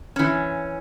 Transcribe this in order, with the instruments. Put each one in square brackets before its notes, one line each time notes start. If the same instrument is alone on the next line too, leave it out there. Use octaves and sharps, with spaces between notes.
[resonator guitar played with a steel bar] E3 C#4